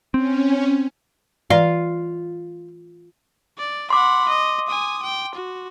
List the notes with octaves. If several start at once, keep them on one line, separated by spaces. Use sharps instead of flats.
C4 C#4
E3 F4 D5
D5
F#5 B5 C6 D6
D#5
G#5 D#6
G5
F#4